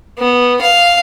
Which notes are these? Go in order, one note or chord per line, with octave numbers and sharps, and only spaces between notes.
B3
F5